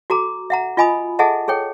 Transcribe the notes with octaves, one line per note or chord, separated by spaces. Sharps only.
F#4 A4 A#5 D6
E5 F#5 A#5
F4 D#5 G#5 B5 D#6
G#4 A4 D#5 E5 F#5 A5
G#4 A4 C#5 G5